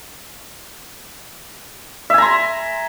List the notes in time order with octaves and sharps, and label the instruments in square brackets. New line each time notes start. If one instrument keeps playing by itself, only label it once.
[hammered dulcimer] E5
G#5
A#5
C6